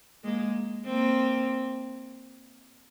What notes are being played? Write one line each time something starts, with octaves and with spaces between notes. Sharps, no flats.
G#3 A#3
A#3 C4